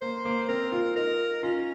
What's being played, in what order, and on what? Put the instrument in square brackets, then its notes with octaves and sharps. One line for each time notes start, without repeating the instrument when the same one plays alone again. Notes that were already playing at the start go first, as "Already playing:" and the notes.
[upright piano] A#3 [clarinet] C5
[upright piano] A#3
[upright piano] C4 [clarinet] A#4
[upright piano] F4
[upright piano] D#4 [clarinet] A#4
[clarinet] C#4 [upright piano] F4